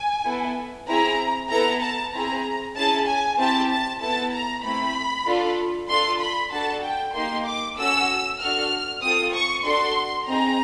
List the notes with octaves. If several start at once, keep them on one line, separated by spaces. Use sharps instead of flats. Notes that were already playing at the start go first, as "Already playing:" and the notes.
Already playing: G#5
B3 E4 A4
C4 E4 G#4 A#5
B3 E4 A4 A#5
A5
C4 E4 G#4 A#5
C#4 E4 G#4 A5
G#5
C4 E4 G4 A5
A5
B3 E4 A4 A5
A#5
A3 C4 E4 B5
D4 F4 A4
D4 F4 A4 C6
B5
D4 F#4 A4 A5
G5
A#3 D#4 G4 C6
D6
C#4 F#4 A4 E6
D4 F#4 A4 F6
C4 F4 A4 D#6
C#6
D4 F#4 A4 C6
C4 D#4 G#4 A#5